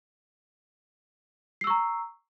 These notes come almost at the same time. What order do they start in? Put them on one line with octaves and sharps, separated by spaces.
C7 E6 C#6 A#5